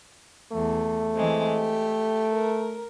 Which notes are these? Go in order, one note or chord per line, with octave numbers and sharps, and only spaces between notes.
E2 A3
E3 G#3 C4
G4
A#4